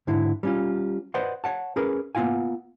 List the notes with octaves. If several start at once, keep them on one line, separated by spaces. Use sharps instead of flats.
G#2 D3 E4
G3 C#4 F4
B4 C5 D5 D#5 F#5 C6
C#5 F#5 A5
C#4 G#4 A#4 B4
A#3 B3 D4 F4 F5 G#5